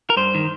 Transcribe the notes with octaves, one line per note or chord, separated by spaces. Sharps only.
A#4
G2 C5
D#3